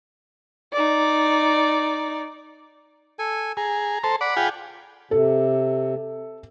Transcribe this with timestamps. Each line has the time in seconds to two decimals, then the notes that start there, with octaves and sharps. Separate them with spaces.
0.73 D#4 D5
3.19 A4 G#5
3.57 G#4 A#5
4.04 A4 C5
4.21 D5 F#5 B5
4.37 F4 G#4 G5
5.11 C3 A4